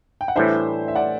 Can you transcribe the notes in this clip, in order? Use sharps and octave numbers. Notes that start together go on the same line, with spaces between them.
G5
F#5
A2 E3 G3 D4 C5 E5
E5
D5 F#5